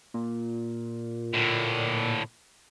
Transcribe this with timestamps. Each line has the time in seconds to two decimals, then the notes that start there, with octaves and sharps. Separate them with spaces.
0.14 A#2
1.33 A2 D3